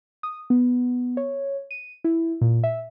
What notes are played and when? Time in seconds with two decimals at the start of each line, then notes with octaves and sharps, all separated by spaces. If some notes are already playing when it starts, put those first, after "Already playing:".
0.23 D#6
0.50 B3
1.17 C#5
1.71 D#7
2.04 E4
2.41 A#2
2.64 E5